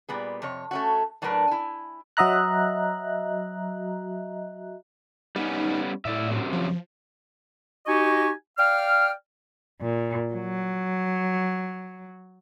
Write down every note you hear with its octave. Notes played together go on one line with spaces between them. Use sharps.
A#2 G3 B3 G#4
F2 C3 C#5
A3 C#4 F#4
A2 F#3 D4 G#4 A#4 B4
E4 G#5
F#3 F#4 D#5 E5 A#5 F#6
G3 B3 C#4 D#4
A2 E4 D5 E5
F#2 C3 F#3
F3
D#4 F#4 G4 D#5 G#5 C#6
D5 F5 G5 F6
A#2
F#3